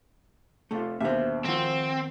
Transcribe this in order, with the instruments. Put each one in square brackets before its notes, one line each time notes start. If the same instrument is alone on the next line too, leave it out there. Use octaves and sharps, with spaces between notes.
[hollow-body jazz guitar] C3 A3 [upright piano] F4 A4
[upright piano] D#2 B2 D3 [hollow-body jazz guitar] C5 E5
[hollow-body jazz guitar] D#3 C5 F#5 [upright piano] F3 F4 [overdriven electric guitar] C4